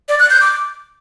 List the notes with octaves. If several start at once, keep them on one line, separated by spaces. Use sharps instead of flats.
D5
F#6
G6
D6